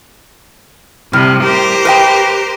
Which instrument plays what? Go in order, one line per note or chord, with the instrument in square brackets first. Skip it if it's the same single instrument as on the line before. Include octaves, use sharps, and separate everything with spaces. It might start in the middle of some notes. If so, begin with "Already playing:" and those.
[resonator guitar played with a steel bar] A2 G3 [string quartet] C3
[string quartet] G4 A#4 C5
[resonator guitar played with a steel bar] B4 D#5 G5